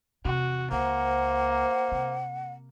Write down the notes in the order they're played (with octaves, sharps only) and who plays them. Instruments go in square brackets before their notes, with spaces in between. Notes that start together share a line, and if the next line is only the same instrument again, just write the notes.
[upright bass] E2 C3 [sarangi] F#4
[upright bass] C#2 [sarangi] A#3 [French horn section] C5 [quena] F#5
[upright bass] C3